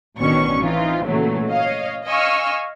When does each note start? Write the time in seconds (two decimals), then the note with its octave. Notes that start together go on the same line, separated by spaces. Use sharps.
0.19 A1 B2 D#3 C#4 D4 C#6
0.61 E3 C4 D#4 F4
1.04 A#2 C#3 E3 F#3 A3 A#3
1.48 C#5 D#5 F5
2.06 D#5 F5 G#5 C#6 E6 F6